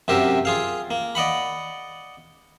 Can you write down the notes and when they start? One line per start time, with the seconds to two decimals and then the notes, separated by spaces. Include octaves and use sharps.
0.08 F#2 C3 G4 A#4 E5
0.45 F4 G#4 F5
0.91 A#3
1.15 D5 D#5 F#5 B5